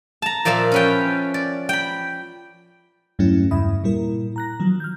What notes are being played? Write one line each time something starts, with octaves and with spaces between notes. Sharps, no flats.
A5 A#5
A#2 F3 D5 E5 F5
C#4 B4 G5
D5
G5 B5
E2 G2 F#3 A3 C#4 E4
E2 G2 C#3 E5 B5 D#6
A#2 G3 E4 A#4
A#5 F#6 A#6
D#3 F3 F#3
F6 G6